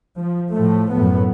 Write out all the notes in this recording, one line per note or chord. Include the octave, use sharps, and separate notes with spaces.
F3
A2 F3 A3
F#2 A2 B3